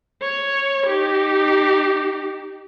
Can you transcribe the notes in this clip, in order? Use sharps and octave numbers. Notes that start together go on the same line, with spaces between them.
C#5
D#4 G4